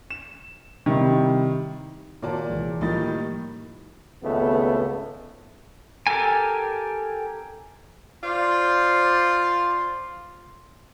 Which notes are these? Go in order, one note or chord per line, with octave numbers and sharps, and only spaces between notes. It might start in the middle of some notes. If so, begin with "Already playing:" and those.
E7
C3 D#3 G3 E4
A#2 D#3 F#4 A#4 C#5 D5 A5
C2 E3 G#3
A2 D#3 F3 G3 A#3 F4 D#5 A6
G#1 C#2 A3 B3
G4 A4 A#4 G#5
F4 C5 D5 C6